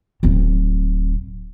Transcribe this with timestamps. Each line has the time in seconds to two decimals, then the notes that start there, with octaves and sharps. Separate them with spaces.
0.23 D1 C4